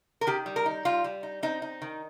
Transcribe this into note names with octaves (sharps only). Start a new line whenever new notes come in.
A#4
D#3 G4
G3
A#4
D#4
G3 F4
G3
D#4
C4 D#4
D#4
D#3